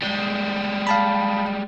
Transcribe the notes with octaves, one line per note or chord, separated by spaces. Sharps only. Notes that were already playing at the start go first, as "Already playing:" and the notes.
G3 G#3
F5 A5 B5